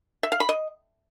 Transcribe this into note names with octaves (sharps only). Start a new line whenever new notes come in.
E5
F5
B5
D#5